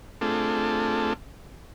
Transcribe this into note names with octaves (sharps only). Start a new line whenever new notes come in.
A3 C4 D4 F4 G#4 A4